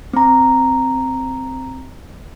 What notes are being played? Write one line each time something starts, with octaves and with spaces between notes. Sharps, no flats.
C4 A#5